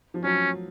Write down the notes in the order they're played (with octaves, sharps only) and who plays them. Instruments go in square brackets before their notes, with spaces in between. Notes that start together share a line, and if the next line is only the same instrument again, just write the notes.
[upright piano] F3
[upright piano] F#3 [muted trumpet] C#4